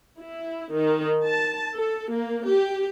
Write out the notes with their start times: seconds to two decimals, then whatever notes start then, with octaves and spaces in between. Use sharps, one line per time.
0.18 E4
0.74 D#3
1.25 A5
1.75 A4
2.12 A#3
2.48 G4